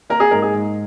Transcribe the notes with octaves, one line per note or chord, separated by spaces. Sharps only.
A#3 A#4
G#4
G#2 A#4
G#4
G#2